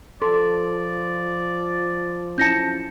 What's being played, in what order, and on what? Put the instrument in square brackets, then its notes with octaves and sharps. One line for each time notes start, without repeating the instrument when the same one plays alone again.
[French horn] F3 [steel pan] A4 [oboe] D5 [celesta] C6
[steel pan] C#4 E4 A5 [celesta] G6 A#6 C#7